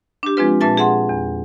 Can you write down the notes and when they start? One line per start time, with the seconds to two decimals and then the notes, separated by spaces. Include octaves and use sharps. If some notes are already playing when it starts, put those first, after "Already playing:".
0.23 D4 G4
0.37 F3 G#3 C4 D4 F4 B4
0.61 A#2 B4 E5 A5 A6
0.77 G#4 E5 F#5 C6
1.09 E2